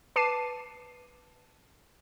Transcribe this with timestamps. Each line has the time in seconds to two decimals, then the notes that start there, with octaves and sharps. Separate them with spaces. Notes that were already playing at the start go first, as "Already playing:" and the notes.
0.16 B4 A5 D6 C7 D#7 E7